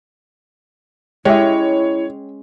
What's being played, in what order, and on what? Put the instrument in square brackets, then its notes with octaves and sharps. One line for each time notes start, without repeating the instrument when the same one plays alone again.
[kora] G#3 C#4 [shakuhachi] E4 [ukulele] G4 E5 [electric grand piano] C#5